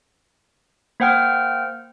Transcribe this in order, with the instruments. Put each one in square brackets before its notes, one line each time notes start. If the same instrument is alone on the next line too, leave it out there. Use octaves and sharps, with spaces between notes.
[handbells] A#3 C5 F#5 G5 F6